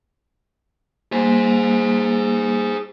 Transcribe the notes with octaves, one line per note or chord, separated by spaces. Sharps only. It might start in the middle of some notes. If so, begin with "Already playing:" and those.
G3 A#3 G#4 C5